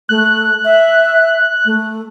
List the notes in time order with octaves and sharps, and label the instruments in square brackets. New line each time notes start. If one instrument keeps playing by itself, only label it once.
[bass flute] A3 [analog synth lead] F#6
[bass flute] E5
A3